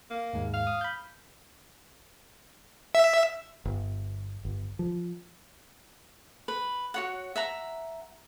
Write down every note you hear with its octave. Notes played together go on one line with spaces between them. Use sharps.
A#3
D#2 G#2 G#3
F5
D#6
B5 G6
E5
G1
G1
F3
B4
F#4 C#5 F#5
E5 F#5 A#5